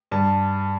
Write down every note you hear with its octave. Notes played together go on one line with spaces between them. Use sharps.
G2 A5